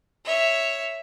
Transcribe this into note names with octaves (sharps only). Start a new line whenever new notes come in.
C#5 E5